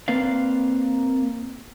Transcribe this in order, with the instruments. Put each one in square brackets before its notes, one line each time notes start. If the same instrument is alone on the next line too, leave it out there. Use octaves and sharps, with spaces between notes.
[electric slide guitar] A#3 C4 B4 D5 F5